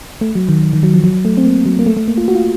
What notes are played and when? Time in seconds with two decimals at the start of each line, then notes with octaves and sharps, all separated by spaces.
0.21 A3
0.35 F#3
0.49 D#3
0.73 D#3
0.83 F#3
0.94 F3
1.04 F#3
1.25 A3
1.37 C4
1.45 A#3
1.66 F#3
1.79 A#3
1.86 A3
1.97 A3
2.08 A#3
2.17 F4
2.28 F#4
2.35 F4